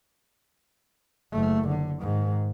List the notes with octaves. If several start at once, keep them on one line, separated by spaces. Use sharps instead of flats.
F#1 A3
D3
G#2 D#3